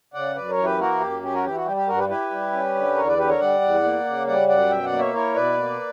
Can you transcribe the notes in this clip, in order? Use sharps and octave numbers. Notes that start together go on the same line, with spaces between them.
C#3 D5 F#5
F#2 B4 D5
A#4 C#5
E3
G4 B4
A#3 F#4 A#4
F#2 G4
C#4 G4
F#4 A#4
E3 G4
F#4
G3 G4
G4
G2 F#4 A#4
G4 B4
E4 G4 B4
G3
C#4
D3
E2 A#4 C#5
B4 D5
D3 G4 B4
A#4 C#5
G3 D5 F#5
E2
A#3
C#3
G3 D5 F#5
F#2 D5 F#5
B2 E5 G5
D5 F#5
A#3
C#5 E5
E4 A#4 C#5
B2 B4 D5
A#3